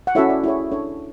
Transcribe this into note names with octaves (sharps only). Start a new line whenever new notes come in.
F#5
C#4 E4 F#4 A4 C#5 E5
D5
E4 G#4 C#5
D4 A4 C#5